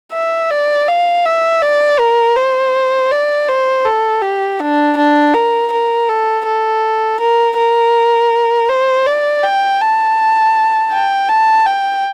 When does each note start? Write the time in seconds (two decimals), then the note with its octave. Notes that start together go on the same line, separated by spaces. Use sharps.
0.13 E5
0.50 D5
0.88 F5
1.25 E5
1.62 D5
1.99 A#4
2.36 C5
3.11 D5
3.48 C5
3.85 A4
4.22 G4
4.60 D4
4.97 D4
5.34 A#4
5.72 A#4
6.09 A4
6.46 A4
7.20 A#4
7.57 A#4
8.69 C5
9.06 D5
9.43 G5
9.81 A5
10.92 G5
11.29 A5
11.66 G5